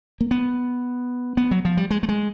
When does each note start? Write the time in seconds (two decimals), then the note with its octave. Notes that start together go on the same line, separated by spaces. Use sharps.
0.21 A#3
0.31 B3
1.37 B3
1.51 F#3
1.65 F3
1.77 G3
1.91 G#3
2.03 A3
2.09 G#3